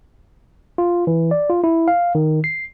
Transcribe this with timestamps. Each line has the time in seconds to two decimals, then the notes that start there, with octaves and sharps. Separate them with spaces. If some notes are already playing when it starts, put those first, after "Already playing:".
0.78 F4
1.07 E3
1.31 D5
1.50 F4
1.64 E4
1.88 F5
2.15 D#3
2.44 C7